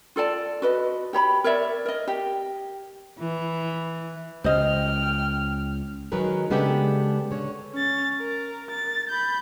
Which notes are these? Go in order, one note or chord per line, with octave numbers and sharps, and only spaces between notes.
F4 A4 D5 A5
F#4 B4 D#5
G4 C#5 A#5 B5
A#4 C#5 D5 E5
A#4 D#5
G4
E3
C#2 C5 D#5 G5 F6
D#3 F#3 G#3 D#4 A#4 B4
C#3 G#3 B3 D4 G4 A4
D3 C#5
C#4 A6
A#4
A6
B5 G6